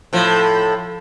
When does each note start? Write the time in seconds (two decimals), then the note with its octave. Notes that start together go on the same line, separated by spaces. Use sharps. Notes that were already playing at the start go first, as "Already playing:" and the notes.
0.13 A2 F3